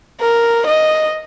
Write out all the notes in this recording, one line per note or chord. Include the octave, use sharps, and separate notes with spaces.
A#4
D#5